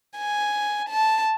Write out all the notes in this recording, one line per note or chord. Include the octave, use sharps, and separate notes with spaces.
G#5
A5